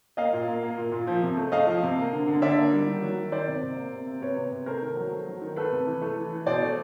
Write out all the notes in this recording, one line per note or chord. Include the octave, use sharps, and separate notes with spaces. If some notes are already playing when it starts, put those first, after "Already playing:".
A#3 D#5 F5
A#2
A#3
A#3
A#2
A#2
F3
C3
A3
A3 D#5 F5
F3
C3
A#3
D3
D3
D3 D5 E5
A#3
G3
D#3
F#3
D#3
D#3 C5 D5
C3
C3
A#3
C3
C3
C3 B4 C#5
C3
C3
A3 A#4 C5
D#3
F#3
A3
F#3
D#3
A3 A4 B4
C3
E3
A3
E3
E3
B2 C5 D5
A3